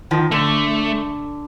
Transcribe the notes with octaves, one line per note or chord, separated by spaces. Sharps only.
D#3 F3
D3 A3